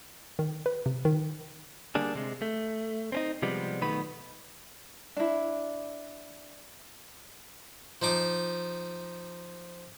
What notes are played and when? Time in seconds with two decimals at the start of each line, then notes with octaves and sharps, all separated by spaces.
0.39 D#3
0.66 B4
0.86 C3
1.05 D#3
1.95 D3 G3 A#3 D4 G#4
2.16 C3 G#3
2.42 A3
3.12 C4 C#4 D#4
3.42 C3 F3 G3 G#3 B3
3.81 B1 D#3 A3 B3 B4 B5
5.17 D4 E4
8.02 F3 D#4 D6